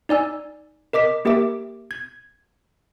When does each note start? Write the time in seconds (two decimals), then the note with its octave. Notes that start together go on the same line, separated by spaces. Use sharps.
0.09 D#4 D5 G#5 E6
0.93 A#4 D#5 D6 B6
1.25 A#3 G4 A#4 E5 D6
1.91 G#6